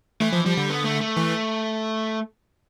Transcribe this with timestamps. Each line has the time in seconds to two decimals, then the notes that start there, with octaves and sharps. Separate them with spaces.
0.21 E3 A3
0.33 F3
0.45 F3 G3
0.57 D3
0.70 B3
0.85 A3
1.01 A3
1.17 E3